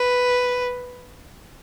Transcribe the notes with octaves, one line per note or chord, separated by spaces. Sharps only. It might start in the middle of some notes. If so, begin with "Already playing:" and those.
Already playing: B4